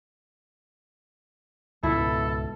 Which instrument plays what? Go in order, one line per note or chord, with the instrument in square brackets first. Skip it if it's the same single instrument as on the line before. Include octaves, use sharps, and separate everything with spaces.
[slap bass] C#2 G#2 [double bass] B2 [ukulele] E4 [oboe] A4